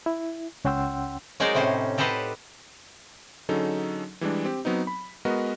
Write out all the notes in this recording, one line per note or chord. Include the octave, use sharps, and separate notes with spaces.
E4
C#2 C#4 F#5 G5 C6 E6
F#3 G#3 D#4 A#4 C5 D5
A2 C3 C#4 C5
G4 A4 B4 C5 D#5 F#5
D3 F#3 C#4 D#4 G#4 A4
E3 G3 G#3 D4
C4 G4
F#3 B3 C4 D#4
B5
G#3 B3 F#4 A#4 B4 D#5